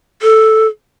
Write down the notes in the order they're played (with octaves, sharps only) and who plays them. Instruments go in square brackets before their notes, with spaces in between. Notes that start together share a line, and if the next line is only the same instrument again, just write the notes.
[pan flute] A4